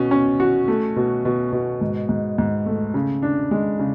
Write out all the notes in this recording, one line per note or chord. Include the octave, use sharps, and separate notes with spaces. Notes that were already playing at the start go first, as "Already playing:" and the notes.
Already playing: B2 C#4
C#4
F#4
A3
B2
B2
B2
G#2
G#2
G#2
A3
C#3
D4
G#3
C#3